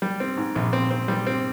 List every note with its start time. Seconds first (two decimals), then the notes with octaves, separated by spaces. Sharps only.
0.02 G3
0.20 C4
0.37 G#2
0.55 A#1
0.73 C4
0.91 C4
1.08 G3
1.27 C4